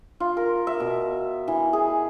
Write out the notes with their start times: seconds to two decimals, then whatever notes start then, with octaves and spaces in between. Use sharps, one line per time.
0.20 F4
0.37 A#4
0.67 E5
0.80 B2
1.48 E3
1.73 G#4